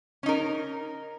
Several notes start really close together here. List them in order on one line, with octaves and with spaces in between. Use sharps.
C#4 D#4 A#4